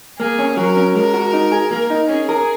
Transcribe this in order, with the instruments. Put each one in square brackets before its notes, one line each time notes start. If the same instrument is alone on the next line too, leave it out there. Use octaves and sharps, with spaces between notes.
[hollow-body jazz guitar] A#3 [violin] G#4
[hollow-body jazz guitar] C#4
[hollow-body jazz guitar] F#3 [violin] A#4
[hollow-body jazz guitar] C#4
[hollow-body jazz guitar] G#3 [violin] A#4
[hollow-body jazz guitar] F#4
D#4
G#4
[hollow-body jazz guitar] A#3 [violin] A#4
[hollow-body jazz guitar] D#4
[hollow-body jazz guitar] C#4 [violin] G#4
[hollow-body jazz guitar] A#4